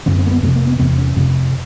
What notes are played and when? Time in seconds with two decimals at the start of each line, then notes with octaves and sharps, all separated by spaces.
0.06 F#2 D3 C4
0.18 C4
0.27 A#3
0.31 B3
0.42 F2 C3 A3
0.55 A#3
0.67 B3
0.79 E2 C3 B3
0.98 C#4
1.16 F2 C3